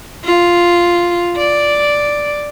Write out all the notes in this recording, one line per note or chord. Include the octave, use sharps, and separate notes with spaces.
F4
D5